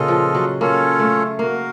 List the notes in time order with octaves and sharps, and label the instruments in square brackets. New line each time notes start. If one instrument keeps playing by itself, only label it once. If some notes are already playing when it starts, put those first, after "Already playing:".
Already playing: [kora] A#2 C#3 [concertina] F4 A4 D#5
[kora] F3
F#3
[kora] A#3 [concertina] C#4 F4 A4 C#5
[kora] A3
[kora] A#3 [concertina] F#4 A#4 F5